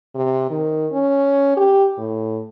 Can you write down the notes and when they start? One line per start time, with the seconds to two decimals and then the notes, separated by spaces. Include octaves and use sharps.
0.15 C3
0.51 D#3
0.92 C#4
1.57 G4
1.98 A2